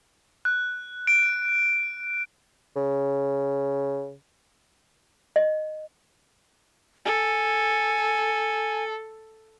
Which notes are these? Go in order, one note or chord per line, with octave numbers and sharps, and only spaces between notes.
F#6
D7
C#3
D#5
A4 G#5